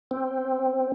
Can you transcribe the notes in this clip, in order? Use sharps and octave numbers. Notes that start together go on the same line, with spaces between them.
C4